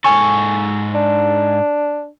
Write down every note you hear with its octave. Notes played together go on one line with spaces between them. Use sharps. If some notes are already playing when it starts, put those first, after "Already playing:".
G#2 A4 G#5 C#6
D4